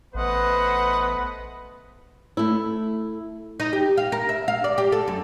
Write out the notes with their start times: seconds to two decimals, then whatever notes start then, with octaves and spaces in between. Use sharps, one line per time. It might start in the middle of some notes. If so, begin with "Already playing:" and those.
0.14 A1 A3 B3 B4 C5 D#5 F#5
2.37 A3 E4
3.60 D#4
3.73 G4
3.97 F5
4.12 A#4
4.29 E5
4.48 F5
4.64 D5
4.78 G4
4.92 A4
5.08 F#2